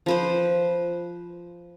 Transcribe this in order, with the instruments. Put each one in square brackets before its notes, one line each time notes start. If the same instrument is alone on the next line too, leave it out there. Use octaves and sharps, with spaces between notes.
[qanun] F3 B4 C5